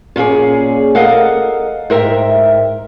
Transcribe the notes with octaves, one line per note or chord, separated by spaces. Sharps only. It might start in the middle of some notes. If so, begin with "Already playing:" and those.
A#2 C#4 F4 G#4 D5
A4 A#4 D#5 F5 F#5
G#2 A#4 E5 G5